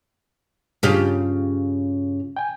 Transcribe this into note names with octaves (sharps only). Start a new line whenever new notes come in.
G2 C#3 F4 G4
G5 G#5